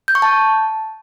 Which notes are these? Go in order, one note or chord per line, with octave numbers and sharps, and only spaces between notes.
G6
C#6
A5